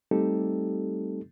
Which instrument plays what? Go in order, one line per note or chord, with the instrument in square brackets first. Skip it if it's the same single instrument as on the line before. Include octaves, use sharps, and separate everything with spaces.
[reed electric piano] G3 A3 C4 D#4 G4 A4